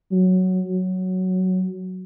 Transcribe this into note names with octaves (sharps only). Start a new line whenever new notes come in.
F#3
F#3